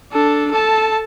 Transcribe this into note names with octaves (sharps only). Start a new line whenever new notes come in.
D4 A4
A4 A5